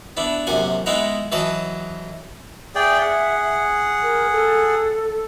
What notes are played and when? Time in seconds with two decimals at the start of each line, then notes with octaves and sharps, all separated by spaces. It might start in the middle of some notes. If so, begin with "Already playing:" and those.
0.17 B3 D4 E4
0.47 A#1 F#2 C3 F#5 G#5
0.86 G#3 B3 D#4 E4 F#5 A#5
1.32 E3 F#3 B4 D#5 A5
2.75 G#4 D5 E5 G5
3.01 G#4 F#5
4.03 A#4
4.32 A4